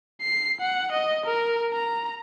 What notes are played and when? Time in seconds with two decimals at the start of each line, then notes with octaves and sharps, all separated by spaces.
0.21 C7
0.61 F#5
0.92 D#5
1.26 A#4
1.73 A#5